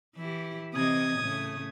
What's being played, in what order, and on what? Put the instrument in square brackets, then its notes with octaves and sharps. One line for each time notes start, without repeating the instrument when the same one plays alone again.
[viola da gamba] E3 E4 G4
[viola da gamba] C3 E3 D#5 [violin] D#6 G#6
[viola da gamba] A2 C#3 A3